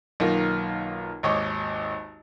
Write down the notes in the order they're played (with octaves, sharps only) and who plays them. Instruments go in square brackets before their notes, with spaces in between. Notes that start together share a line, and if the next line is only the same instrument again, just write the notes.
[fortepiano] B1 D#3 A#3 F4 A#4
G#1 D#2 C#5 D#5 D6